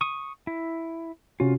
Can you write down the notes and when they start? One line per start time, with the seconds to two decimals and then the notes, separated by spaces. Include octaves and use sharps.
0.01 C#6 D#6
0.47 E4
1.40 C3 C#4 F4 F#4